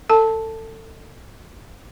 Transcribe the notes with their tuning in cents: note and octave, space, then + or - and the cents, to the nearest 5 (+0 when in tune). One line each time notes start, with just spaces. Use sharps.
A4 +25 A5 +0